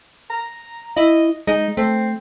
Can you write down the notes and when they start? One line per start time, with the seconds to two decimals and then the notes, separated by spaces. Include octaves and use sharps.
0.30 A#5
0.97 E4 D#5
1.47 G#3 D#4
1.77 A3 C4